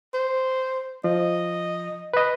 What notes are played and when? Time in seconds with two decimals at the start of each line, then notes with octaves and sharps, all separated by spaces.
0.14 C5
1.04 F3 D#5
2.13 B4 D#5